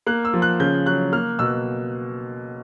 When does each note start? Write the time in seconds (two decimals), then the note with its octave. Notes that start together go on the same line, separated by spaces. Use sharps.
0.06 A#3 F#6
0.25 E6
0.34 F3
0.42 F#6
0.60 C#3 G6
0.86 F#3 F#6
1.12 A#3 F6
1.39 B2 E6